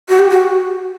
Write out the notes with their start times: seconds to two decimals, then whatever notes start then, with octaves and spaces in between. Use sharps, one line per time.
0.09 F#4
0.19 G4
0.30 F#4